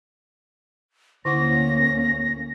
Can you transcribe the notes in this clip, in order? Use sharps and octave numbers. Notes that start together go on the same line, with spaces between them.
D2 D3 A#3 C#4 E4 F#5 A#6